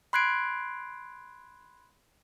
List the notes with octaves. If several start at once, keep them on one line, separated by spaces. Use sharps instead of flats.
B5 C6 F#6 G#6 C7 D7